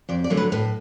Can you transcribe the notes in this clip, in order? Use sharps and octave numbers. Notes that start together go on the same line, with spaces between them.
F2 D5
D5
D3 F#3 A3
B4
A2 B4